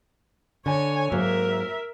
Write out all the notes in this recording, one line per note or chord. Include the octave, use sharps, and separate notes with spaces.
D3 C#5 G#5
G#2 F#3 A#3 A#4 E5